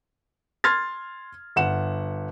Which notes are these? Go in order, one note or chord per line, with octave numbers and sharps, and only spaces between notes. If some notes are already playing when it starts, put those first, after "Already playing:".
C6 F6 G#6 A6
G1 F#5 E7